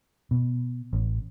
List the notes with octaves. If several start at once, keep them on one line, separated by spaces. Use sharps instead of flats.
B2
A1